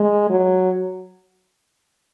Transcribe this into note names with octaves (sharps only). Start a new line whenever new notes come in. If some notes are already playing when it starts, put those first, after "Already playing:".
Already playing: G#3
F#3